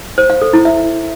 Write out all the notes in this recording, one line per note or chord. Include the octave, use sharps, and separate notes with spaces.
C5
F5
A4
E4
E5